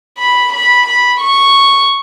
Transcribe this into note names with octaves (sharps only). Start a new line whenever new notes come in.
B5
B5
B5
C#6